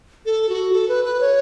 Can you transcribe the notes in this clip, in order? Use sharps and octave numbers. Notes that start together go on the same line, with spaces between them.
A4
F#4
A4
B4
B4
C#5